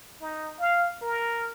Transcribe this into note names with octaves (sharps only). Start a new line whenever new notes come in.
D#4
F5
A#4